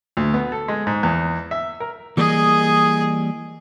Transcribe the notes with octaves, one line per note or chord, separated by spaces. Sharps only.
D2
B3
A4
G#3
G#2
E2
E5
A#4
E3 G3 A#3 G#4 D#5